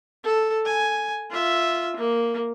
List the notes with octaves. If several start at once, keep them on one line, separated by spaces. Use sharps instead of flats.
A4
G#5
F4 E5
A#3